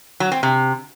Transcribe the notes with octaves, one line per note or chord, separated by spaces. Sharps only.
F#3
C4
C3